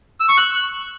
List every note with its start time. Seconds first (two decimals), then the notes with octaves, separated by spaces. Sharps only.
0.20 E6
0.29 C#6
0.37 F#6